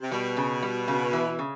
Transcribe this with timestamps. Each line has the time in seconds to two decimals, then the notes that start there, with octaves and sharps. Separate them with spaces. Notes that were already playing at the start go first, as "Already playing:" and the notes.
0.01 C3
0.12 B2 G3
0.37 C#3
0.63 G3
0.88 C#3
1.13 E3
1.39 C#3